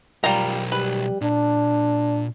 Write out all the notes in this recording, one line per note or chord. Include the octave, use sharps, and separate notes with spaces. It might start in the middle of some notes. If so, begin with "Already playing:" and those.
B1 G3 F4 A#4 A#5
G3 B4
A#2 D4